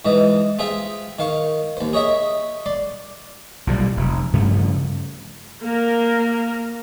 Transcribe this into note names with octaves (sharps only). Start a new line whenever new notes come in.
G#2 E3 D#5
F4 G#4 C5 E5 G5
D#3 F5 C#6
D#2 C5
G#4 C#5 D#5 E5
D5 C6
B1 A#2 C#3 G3
F1
G2 C#3 F3 A3
A#3 A#4